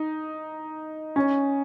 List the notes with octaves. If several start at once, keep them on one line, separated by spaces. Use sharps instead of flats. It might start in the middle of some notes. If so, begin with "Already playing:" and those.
Already playing: D#4
C#4